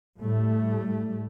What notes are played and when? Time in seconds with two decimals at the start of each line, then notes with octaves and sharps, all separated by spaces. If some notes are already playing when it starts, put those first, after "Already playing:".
0.20 A2 G3 A3